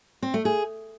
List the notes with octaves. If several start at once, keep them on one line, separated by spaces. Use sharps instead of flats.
C4
A3
G#4